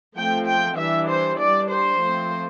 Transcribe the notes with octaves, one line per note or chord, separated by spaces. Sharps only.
F3 A3 C4 G5
G5
E3 G3 D4 E5
C5
G3 D4 D5
C5
F3 A3 C4